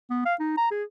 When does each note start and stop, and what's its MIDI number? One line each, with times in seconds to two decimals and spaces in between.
0.10 0.22 59
0.25 0.34 77
0.40 0.57 63
0.57 0.69 82
0.71 0.83 68